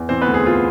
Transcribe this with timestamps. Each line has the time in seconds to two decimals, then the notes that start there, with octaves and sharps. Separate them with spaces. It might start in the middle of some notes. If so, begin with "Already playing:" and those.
Already playing: E2
0.09 E3 C4 C5
0.22 B3 B4
0.27 D2
0.34 G#4
0.46 F4